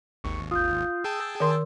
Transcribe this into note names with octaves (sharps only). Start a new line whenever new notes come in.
G#1 D#2 C#6
F4 D#6 G6
G#4 G5 A5 E6
D#3 A#4 C6